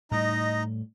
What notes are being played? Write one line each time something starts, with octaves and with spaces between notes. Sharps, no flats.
A2 G3 D#4 D#5 A#5